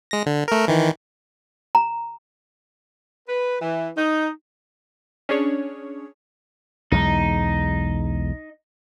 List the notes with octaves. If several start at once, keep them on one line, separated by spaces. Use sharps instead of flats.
G#3 A#6
D3
A3 A#4
D#3 E3
A#5
B4
E3
D#4
C#4 D4 G#4 C#5
B1 E2 G#3 D#4